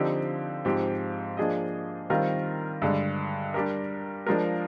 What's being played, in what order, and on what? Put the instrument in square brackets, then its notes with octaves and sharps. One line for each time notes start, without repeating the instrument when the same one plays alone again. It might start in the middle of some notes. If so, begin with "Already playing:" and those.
Already playing: [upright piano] D3 F3 C4 D#4 G4
G#2 F3 C4 G4
F3 A#3 D4 G#4 D#5
D#3 G3 C4 F4 A#4
G2 D3 G#3
G3 D4 G4 A#4
F3 G#3 D4 F4 A#4